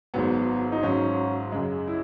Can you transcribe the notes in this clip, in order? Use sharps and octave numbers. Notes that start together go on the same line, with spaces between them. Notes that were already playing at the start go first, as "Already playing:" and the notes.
G#1 G#2 F#3 B3
D#4
G#1 G#2 F#3 C#4
F#2 C#3 G#3
E4